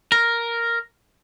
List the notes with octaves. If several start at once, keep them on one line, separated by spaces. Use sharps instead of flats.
A#4